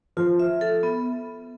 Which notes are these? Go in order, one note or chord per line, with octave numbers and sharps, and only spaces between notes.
F3 F4
E5
A4
B3